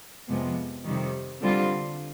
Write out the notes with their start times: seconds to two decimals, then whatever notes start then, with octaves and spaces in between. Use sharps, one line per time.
0.28 F2 C3 F3 G#3 B3
0.85 F2 C3 D#3 G3
1.41 D3 G3 C4 F4